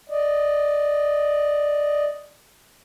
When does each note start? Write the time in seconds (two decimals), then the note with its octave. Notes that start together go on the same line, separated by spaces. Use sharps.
0.10 D5 D#5